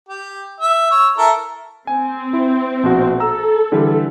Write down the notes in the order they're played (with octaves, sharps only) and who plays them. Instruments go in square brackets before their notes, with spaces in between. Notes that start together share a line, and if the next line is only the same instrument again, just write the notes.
[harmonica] G4
E5
C#5 E6
E4 A4 A#4
[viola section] C4 [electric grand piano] G#5
[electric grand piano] E4
A#1 B2 F#4
[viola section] A4 [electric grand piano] A#5 E6
[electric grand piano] D3 E3 G3